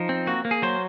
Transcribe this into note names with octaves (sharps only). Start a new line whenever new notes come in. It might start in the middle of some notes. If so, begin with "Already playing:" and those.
Already playing: F3 D#4
C4
A#3 F#4
A#3
G#4
F#3 C5